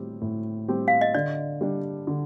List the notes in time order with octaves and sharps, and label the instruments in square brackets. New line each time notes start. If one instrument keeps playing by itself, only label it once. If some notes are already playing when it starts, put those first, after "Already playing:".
Already playing: [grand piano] A2 G3 C4 G4
A2
G3 C4 G4
[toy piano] F5
D#5
[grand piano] D3 [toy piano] D5
[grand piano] G3 D4 G4
D3